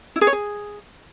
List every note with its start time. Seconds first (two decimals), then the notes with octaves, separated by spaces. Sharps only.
0.16 E4
0.21 G#4
0.27 C#5
0.33 G#4